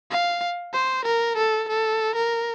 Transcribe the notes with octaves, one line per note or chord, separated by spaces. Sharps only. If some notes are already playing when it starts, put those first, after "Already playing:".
F5
C5
A#4
A4
A4
A#4